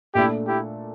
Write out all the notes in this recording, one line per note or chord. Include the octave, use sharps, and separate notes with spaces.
A#2 A3 D4 E4 G4 A4
E4 G4